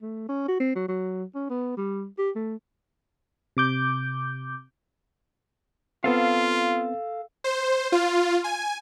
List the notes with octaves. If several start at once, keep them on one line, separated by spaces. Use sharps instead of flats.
A3
C#4
F#4
C4
F#3
F#3
C#4
B3
G3
G4
A3
C3 D6 G6
B3 C4 F4 A4 F5
C5
F4
G#5